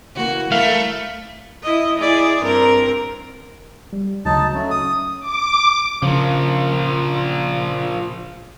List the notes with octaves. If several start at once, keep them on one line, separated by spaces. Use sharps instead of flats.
C#3 E3 A#3 F#4
A3 E4 A4 A#4 E5 F5
E4 D#5
E4 G#4 D5
G2 C4 A#4
G3
D2 C#3 F#3 D#4 A5
F#3 A3 C#4
D#6
D6
A#2 C#3 F3